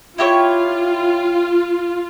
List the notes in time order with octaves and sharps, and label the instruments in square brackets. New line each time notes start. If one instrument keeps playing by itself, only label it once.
[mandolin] E4 G4 C#5 [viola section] F4